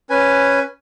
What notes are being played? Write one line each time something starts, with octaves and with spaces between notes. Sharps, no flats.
C#4 B4 G#5